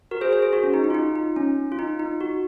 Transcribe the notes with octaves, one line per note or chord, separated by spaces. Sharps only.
F#4 A#4
G#4 C5
G#4 C5
G#4
F#4
C#4
D#4
D#4
F4
D#4
D#4
C#4
F4
D#4
D#4
F#4